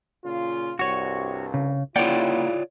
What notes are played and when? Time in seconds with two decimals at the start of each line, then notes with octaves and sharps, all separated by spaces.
0.24 A#2 C#3 F4
0.79 C2 G2 F#4 C#5
1.54 C#3
1.96 C#3 A#3 E4 F4 C#5 D5 F#5 G5